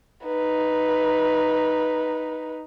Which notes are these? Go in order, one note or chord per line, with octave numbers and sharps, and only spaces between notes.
D#4 B4